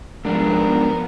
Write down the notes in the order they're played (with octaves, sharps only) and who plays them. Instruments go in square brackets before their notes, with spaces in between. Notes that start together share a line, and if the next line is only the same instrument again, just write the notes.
[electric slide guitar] G#2 D4 [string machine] F3 B3 [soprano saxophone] A#4